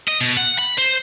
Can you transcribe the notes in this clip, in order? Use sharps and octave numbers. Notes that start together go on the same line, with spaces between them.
D#5
B2
F#5
B5
C5